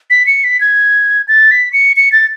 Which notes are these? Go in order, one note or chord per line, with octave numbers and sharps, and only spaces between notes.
B6
C#7
B6
G#6
A6
B6
C#7
C#7
A6